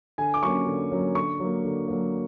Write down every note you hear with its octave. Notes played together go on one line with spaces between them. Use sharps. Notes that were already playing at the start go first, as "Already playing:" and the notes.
D3 G#5
D6
F#3 A#3 C#4 C#6
D3
F#3 A#3 C#4
D3 C#6
F#3 A#3
D3
F#3 A#3